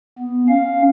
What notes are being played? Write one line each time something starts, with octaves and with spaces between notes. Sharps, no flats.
B3
C#4 F5